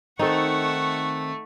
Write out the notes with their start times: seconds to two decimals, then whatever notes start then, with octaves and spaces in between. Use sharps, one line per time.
0.19 D#3 A3 C4 D#4 A4 F#5 C#6